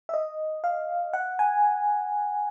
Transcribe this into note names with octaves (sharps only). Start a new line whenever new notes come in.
E5
D#5
F5
F#5
G#5